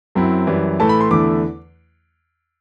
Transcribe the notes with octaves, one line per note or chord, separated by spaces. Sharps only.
F#2 F#3 C4 E4
F#2 E3 G3
A2 E3 A3 E4 A5
B5
C6
E2 D3 A3 E4 D6